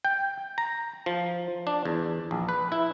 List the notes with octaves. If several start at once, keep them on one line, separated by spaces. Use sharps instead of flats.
G5
A#5
F3
D4
E2
A#1
B4
E4